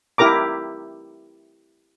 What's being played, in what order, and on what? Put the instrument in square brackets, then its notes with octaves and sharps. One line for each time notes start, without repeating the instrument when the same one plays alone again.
[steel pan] E4 G4 A#4 A#5 D6